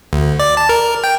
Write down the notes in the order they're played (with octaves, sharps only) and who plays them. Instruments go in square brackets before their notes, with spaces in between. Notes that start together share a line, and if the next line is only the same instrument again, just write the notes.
[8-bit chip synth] D2
D5
A5
A#4
G5